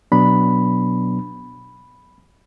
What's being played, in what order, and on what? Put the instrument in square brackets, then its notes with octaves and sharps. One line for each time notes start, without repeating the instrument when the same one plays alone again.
[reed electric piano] B2 F#3 B3 D4 B5